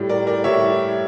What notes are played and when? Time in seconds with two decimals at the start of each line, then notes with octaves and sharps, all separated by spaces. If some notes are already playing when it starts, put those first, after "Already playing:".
Already playing: A2 G3
0.09 A#4 D5
0.27 A#4 D5
0.44 A2 G3 C#5 E5